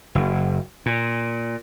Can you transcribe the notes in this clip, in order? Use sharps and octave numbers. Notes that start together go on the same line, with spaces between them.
F#1
A#2